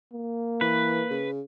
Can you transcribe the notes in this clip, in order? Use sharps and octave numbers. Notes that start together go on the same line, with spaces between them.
A#3
E3 B4
C#3